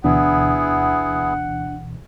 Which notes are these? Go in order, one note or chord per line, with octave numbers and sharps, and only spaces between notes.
D2 B2 E3 B3 D4 E4 G#4 F#5